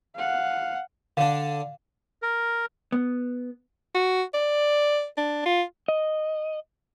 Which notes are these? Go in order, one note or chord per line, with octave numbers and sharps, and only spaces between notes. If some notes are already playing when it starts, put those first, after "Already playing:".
F5 F#5
D3 D4 F5
A#4
B3
F#4
D5
D4
F4
D#5